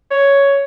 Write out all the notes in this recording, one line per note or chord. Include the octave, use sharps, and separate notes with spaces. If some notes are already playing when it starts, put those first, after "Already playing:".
C#5